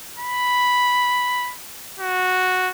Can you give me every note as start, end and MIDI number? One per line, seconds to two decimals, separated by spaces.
0.19 1.53 83
2.00 2.71 66